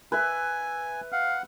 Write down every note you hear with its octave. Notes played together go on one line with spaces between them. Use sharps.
B4 E5 G#5
F5 F#5